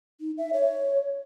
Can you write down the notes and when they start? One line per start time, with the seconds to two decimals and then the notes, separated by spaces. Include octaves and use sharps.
0.21 D#4
0.38 E5
0.53 C#5